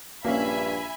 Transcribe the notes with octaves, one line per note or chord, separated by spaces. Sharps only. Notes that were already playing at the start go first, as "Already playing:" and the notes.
A#1 G2 A#3 C#4 E5 G#5 B5